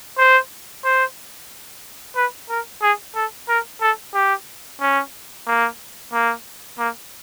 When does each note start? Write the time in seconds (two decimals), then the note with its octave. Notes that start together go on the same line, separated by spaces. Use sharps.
0.18 C5
0.85 C5
2.16 B4
2.50 A#4
2.82 G#4
3.15 A4
3.49 A#4
3.81 A4
4.14 G4
4.81 C#4
5.47 A#3
6.13 A#3
6.79 A#3